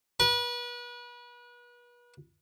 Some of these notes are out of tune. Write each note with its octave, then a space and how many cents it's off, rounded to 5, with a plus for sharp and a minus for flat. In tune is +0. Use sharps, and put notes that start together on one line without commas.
B4 -35